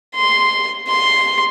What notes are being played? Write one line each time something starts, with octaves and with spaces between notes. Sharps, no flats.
C6
C6